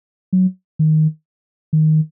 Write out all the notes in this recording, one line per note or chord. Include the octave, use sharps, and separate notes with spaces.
F#3
D#3
D#3